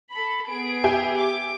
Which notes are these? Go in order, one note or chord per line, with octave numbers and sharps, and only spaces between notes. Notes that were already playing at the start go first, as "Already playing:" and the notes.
A4 B5
B3 G#4 D7
G4 E5 G#5
D6